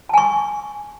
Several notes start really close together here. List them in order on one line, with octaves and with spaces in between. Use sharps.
A5 G#5 C#6